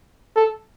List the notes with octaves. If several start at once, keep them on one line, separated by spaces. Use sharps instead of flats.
A4